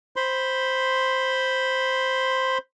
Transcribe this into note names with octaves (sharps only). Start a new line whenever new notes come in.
C5 B5 C6